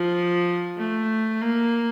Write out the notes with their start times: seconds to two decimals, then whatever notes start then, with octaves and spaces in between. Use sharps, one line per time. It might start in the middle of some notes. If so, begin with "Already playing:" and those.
Already playing: F3
0.78 A3
1.42 A#3